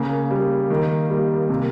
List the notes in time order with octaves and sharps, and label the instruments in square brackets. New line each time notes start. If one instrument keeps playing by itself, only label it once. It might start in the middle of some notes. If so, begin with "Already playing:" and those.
Already playing: [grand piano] C#3 [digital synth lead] A#3
[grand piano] G3
D#3
G3
C3